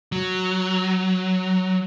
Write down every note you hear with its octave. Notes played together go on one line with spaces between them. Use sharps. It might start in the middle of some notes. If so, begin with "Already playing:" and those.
F#3